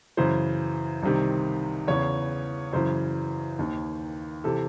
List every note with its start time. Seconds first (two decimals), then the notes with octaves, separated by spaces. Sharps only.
0.17 F#2 C#3 E3 C5
1.03 C2 C3 D#3
1.88 E2 C#3 E3 C#5
2.73 F#2 C#3 E3 C5
3.59 D#2 D#3
4.44 C3 E3 A4